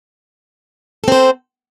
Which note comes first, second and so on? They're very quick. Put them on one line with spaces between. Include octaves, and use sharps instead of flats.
A4 C4 C5